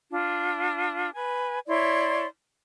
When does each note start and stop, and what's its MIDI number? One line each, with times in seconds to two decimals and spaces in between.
0.11 1.13 62
0.11 1.13 65
1.13 1.58 71
1.13 1.58 80
1.67 2.25 64
1.67 2.25 73
1.67 2.25 74
1.67 2.25 84